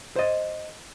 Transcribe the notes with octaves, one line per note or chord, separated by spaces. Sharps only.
C5 D#5